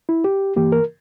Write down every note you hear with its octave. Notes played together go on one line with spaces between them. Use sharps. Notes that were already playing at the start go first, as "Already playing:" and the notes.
E4
G4
G2 E3 A#3 G4
A#4